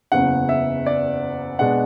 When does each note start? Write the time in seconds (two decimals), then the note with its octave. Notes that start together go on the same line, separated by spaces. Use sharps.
0.12 F#1 E2 C#3 F#5
0.49 E5
0.86 D5
1.59 B2 G#3 D4 F#5